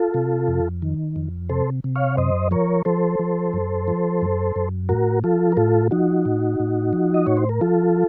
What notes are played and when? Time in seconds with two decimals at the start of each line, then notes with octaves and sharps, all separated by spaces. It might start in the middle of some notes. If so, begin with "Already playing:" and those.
Already playing: F4 A4
0.14 C3
0.48 F2
0.82 D#3
1.16 F2
1.49 C3 A4 C5
1.84 C3
1.96 C#5 F5
2.17 F#2 C5 D#5
2.51 F3 A#4 C#5
2.85 F3 A4 C5
3.19 F3
3.53 F#2
3.88 F3
4.22 F#2
4.56 F#2
4.89 A2 F#4 A#4
5.24 F3 F4 A4
5.52 A#4
5.57 A2 F4 A4
5.91 F3 D#4 F#4
6.26 A2
6.60 A2
6.93 F3
7.14 D#5
7.26 A2 C#5
7.37 C5
7.49 A#4
7.61 F3 F4 A4